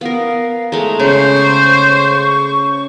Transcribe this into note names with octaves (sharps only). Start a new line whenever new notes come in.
B3 A#4 F5
G#3 A3 A#5
C#3 C5
C#6